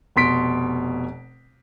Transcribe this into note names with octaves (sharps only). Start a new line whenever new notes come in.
F1 B2 C6 B6 D7